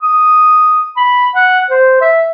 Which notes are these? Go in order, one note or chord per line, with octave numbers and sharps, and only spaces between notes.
D#6
B5
F#5
C5
E5